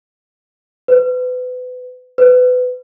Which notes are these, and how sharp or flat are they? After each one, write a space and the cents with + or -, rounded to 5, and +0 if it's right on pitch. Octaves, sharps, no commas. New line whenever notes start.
B4 +30
B4 +25